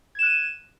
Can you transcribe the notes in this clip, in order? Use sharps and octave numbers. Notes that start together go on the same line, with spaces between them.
F#6 G#6 D#7 E7